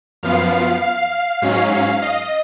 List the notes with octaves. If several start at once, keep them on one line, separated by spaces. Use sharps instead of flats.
F#2 F3 B3 F5
F5
G#2 F#3 C#4
D#5